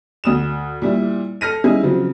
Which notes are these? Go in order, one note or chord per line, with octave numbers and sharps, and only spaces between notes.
D2 D#6 E7
A#2 G3 E4
A4 F6 A#6 D#7
G3 C#4 D#4 E4 G#4
C#3 F3 F#3 C4